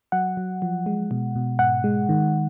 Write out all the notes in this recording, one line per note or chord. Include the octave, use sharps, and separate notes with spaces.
F#3 F#5
F#3
F3
G#3
B2
B2
G#2 F#5
G#3
D#3